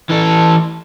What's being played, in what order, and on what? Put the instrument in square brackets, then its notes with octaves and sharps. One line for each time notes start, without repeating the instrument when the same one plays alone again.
[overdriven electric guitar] E3 A4